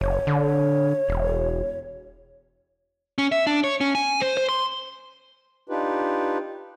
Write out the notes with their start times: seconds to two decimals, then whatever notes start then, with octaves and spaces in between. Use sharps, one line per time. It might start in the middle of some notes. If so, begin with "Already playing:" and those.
0.01 F#1 C#5
0.27 D3
1.09 E1
3.18 C#4
3.32 E5
3.47 D4
3.64 C#5
3.81 C#4
3.95 G#5
4.21 C5
4.37 C5
4.49 C6
5.69 D4 D#4 F4 G4 B4